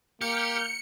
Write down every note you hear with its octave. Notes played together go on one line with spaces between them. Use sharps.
A#3 G4 F6 G6 C#7